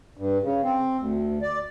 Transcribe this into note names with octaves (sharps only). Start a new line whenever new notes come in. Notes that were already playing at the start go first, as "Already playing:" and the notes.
G2
C#3
C4
D2
D5